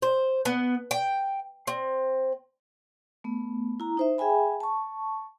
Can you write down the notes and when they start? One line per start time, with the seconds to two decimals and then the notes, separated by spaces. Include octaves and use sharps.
0.02 C5
0.45 B3
0.91 G5
1.67 C4
3.24 A3 B3
3.80 E4 A#5
3.97 D#4 C5 E5
4.18 G#4 E5 G5 G#5 B5
4.60 A5 C#6